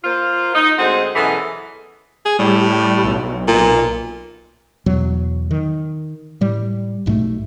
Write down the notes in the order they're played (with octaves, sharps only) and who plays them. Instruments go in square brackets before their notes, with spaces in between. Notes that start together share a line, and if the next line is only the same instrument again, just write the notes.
[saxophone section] A#3 F4 C5
D#4
D2 G#3 C4 G#4 C5 F#5
F#2 B2 E3 B3 G#4 A4
[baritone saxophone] G#4
[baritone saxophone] A2 [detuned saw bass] G3
[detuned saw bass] B1
[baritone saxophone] A#2
[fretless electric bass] E2 B2 F#3
D#3
A2 G3
B1 G#2 B2 A3